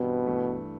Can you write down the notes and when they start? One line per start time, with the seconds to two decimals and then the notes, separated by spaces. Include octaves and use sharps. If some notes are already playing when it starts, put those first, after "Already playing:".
Already playing: G2 B2 E3 G3 C4 E4
0.26 G2 E3 A3